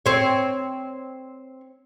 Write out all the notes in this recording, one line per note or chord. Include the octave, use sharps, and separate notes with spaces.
C4 C#5